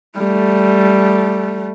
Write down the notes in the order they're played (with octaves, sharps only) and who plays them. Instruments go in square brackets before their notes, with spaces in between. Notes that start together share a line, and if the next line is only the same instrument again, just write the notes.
[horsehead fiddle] G3 A3